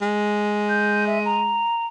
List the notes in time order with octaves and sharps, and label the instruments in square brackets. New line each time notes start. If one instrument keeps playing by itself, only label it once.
[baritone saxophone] G#3
[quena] G6
E5
A#5